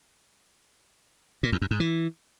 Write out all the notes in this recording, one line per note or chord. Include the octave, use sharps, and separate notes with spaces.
A#2
E2
F#2
G#2
E3